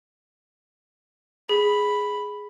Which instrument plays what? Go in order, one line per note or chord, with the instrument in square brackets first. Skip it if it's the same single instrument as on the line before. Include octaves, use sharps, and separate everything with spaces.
[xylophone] G#4 [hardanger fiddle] B5